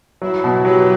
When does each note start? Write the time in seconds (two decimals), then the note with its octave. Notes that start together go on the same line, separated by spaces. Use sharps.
0.22 F#3 E4
0.44 B2
0.65 F#3 G4 B4